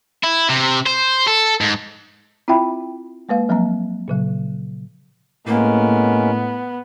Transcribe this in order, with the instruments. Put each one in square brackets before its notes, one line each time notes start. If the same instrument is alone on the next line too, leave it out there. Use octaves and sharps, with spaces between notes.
[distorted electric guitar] E4
C3
C5
A4
G#2
[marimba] C4 E4 F4 E5 G5 B5
G#3 A#3 B4 F5
F3 F#3 A#3 C4 A#5
A#2 C#3 F#3
[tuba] A2 [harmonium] G#3 C#4 A#4 [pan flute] A#3 [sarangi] B3